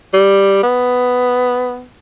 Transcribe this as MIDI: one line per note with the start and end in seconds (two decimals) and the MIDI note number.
0.14 0.63 55
0.63 1.84 59